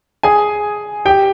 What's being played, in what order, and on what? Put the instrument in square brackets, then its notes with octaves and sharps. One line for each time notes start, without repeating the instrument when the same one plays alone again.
[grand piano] G#4 G#5
G4 G5